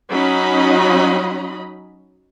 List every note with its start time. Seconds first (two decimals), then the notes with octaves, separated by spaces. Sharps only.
0.10 F#3 C#4 D#4 D#5 B5